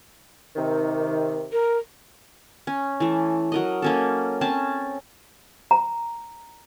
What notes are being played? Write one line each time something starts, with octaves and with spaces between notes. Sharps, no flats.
C3 D#3
A#4
C#4
E3 A3
F#3 A#4 D#5
A#3 C#4 A4
C4 C#4 A5
A#5